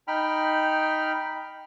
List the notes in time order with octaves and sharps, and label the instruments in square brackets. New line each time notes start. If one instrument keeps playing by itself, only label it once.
[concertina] D#4 G5 B5 F6